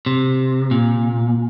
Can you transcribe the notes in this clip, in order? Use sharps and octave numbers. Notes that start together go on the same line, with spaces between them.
C3
A#2